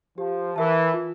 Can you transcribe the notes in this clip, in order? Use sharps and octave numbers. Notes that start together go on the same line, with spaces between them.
F3 G4
E3 A#4 E5 A5
F4